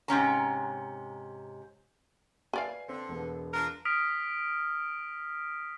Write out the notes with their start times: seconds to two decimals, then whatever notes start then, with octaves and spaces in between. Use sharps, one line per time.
0.08 G#2 C3 C#4 A#5
2.53 B4 D5 F5 G#5 C7
2.88 D3 C4
3.09 E1 B3
3.54 D4 F4 A#4
3.85 D#6 F6 B6 D7